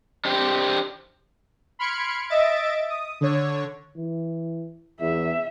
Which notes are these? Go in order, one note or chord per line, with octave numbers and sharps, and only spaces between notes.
D4 G4 C5
B5 C6 F6 G#6 C#7 D7
D#5 E5 A6 D7
D#6
D3 C#5
E3
E2 E5